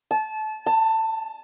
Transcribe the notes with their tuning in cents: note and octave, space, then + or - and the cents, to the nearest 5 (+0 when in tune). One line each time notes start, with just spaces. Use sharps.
A5 -25
A5 +20